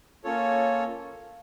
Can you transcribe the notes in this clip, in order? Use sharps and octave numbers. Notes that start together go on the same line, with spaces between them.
A#3 C#4 F4 A4 C#5